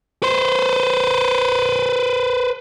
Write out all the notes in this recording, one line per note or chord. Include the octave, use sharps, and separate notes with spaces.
B4 C5